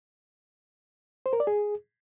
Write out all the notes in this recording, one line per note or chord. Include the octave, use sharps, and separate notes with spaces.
C5
A#4
D5
G#4